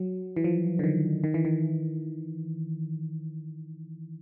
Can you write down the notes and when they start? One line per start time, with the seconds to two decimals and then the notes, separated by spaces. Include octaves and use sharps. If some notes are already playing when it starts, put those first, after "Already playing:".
Already playing: F#3
0.37 E3
0.44 F3
0.79 D3
0.84 D#3
1.24 D#3
1.34 E3
1.45 D#3